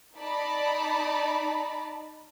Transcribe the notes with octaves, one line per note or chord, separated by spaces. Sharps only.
D#4 D5 A5 B5